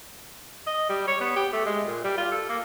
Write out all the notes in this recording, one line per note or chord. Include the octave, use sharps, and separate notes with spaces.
D#5
G3
C#5
B3
G4
A3
G#3
A#2
G3
F4
A4
A#3